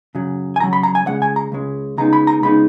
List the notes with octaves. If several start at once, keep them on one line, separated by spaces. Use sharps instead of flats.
F#2 C#3 F#3
G#5
F#2 C#3 F#3 A#5
B5
A#5
G#5
C#2 C#3 G#3 F#5
G#5
A#5
C#2 C#3 G#3
C#2 C#3 G#3 B3 D#4 A#5
B5
A#5
C#2 C#3 G#3 B3 D#4 B5